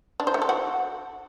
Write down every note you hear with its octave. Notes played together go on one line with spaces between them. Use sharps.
D4
C5
A3
A4
F#4